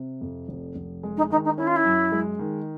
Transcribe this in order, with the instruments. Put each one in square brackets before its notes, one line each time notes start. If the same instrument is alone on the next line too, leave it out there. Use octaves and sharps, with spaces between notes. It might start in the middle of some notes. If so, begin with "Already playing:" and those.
Already playing: [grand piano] C3
F2
F1
F1
G#3
[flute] D#4
[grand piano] D#3 [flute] D#4
[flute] D#4
[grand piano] C#4 [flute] E4
[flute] F4
E4
[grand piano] F#2
G#3
D#3